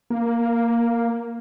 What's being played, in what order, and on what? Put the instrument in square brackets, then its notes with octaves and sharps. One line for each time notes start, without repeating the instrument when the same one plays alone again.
[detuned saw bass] A#3